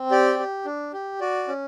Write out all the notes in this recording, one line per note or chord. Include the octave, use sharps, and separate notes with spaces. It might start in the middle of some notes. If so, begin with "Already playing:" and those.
Already playing: C4
G4 D5
G4
D4
G4
F#4 D5
C#4